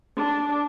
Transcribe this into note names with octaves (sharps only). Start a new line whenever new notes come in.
D4